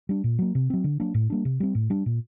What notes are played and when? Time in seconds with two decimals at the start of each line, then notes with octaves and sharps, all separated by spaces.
0.09 G3 D4
0.24 A#2
0.39 F#3 A#3
0.55 C3
0.70 F#3 C4
0.84 D3
1.00 F#3 A#3 D4
1.14 A2
1.30 G3 A#3 D4
1.45 C3
1.60 G3 C4
1.75 A2
1.90 G3 D4
2.06 A#2